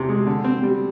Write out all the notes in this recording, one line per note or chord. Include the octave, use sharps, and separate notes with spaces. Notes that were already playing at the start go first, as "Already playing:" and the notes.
Already playing: E2 C3
G#3
D3
C4
G3